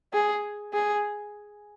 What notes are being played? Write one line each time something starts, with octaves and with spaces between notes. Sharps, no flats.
G#4
G#4